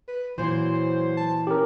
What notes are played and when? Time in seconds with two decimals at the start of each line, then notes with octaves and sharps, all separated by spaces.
0.08 B4
0.38 A#2 E3 F#3 C5
1.17 A5
1.47 C#4 G4 A#4